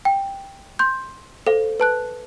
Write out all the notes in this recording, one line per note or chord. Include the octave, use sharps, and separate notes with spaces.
G5
C6 G6
A4 C5 F5
B4 A5 F#6